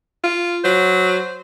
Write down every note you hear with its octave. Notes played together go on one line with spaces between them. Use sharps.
F4
F#3 C5